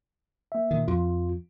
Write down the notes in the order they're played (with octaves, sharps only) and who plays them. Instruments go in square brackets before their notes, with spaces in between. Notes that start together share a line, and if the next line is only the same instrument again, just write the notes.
[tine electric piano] A#3 E5
[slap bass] A#2 D#3
[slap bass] F2 [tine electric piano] F4